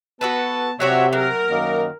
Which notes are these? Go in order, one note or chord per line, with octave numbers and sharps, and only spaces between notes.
B3 F#4 A4 B4 A5
C3 F#3 F#4 C#5 D5 E5
F#3 A#4
F#2 D#3 A#3